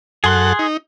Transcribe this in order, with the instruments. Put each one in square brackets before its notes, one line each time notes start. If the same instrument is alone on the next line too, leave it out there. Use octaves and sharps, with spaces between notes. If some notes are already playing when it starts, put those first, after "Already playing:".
[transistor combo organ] F#2 A4 F#5 [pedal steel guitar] G#4 C6 F#6
[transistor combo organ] D#4